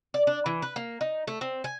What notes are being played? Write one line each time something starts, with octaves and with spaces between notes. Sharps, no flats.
D5
D4
E3
B4
A#3
D#4
A3
C4
G#5